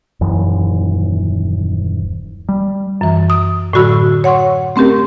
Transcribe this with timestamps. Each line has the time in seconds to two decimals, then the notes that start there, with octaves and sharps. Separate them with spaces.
0.21 D#1 F#2 E3
2.49 G3
3.01 F#2 E3
3.30 D#6
3.73 A2 D3 F#3 F#4 B5 E6
4.24 C#5 F#5 C6 C#6
4.76 A3 C4 C#4 G4 A#4